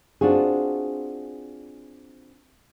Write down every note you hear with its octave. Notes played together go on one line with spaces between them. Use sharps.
C4 D4 F4 F#4 G#4